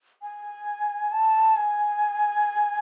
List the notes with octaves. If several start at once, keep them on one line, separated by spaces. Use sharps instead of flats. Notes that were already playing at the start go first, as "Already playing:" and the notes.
G#5
A5
G#5